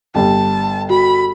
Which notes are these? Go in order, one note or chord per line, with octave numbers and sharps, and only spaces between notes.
G1 G4 A5
F#4 B5